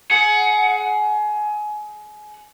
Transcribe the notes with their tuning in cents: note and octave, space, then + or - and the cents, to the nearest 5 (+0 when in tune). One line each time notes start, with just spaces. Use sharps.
G#4 +25 F#5 +5